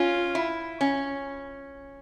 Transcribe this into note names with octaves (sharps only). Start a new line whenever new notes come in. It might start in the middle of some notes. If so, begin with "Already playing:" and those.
Already playing: C#4 F4
E4
C#4